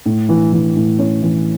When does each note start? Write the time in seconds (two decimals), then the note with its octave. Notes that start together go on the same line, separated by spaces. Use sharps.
0.06 A2
0.29 E3
0.52 E3
0.76 A2
0.99 C#4
1.22 E3